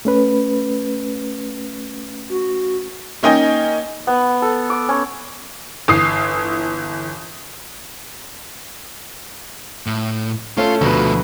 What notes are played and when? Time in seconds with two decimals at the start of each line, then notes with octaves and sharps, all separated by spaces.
0.05 A3 C#4 B4
2.29 F#4
3.23 A#3 C#4 D#4 D#5 G5 G#5
4.07 B3
4.42 A4
4.70 D6
4.89 C#4
5.88 G1 E3 D#6 C7
9.86 A2
10.57 A3 C#4 F4 A4
10.81 D2 B2 F3 A3 B4